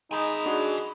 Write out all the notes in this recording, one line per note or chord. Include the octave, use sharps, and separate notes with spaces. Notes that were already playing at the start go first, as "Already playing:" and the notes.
G#3 D#4 G#5 B5
D4 F#4 G#4